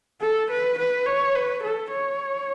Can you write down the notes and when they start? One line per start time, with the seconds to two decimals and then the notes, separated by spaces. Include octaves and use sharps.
0.21 A4
0.50 B4
0.78 B4
1.06 C#5
1.35 B4
1.63 A4
1.91 C#5